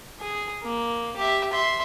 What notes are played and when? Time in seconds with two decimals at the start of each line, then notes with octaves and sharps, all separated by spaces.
0.21 G#4
0.63 A#3
1.17 G4 E5
1.52 E5 C6